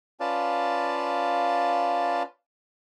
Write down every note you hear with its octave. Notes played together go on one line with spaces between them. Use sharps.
C#4 F4 B4 D5 F5 A5